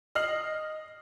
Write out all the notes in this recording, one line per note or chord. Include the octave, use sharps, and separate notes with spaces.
D#5 F6 C7 F#7